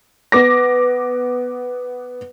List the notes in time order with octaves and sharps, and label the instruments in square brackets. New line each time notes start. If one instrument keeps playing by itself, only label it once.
[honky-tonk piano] B3 D6 A#6